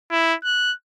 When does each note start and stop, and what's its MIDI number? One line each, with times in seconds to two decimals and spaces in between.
0.11 0.34 64
0.44 0.73 90